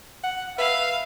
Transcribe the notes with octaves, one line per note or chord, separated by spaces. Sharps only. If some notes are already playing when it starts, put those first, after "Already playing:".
F#5
B4 E5 F5